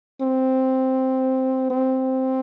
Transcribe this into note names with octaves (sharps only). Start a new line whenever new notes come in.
C4
C4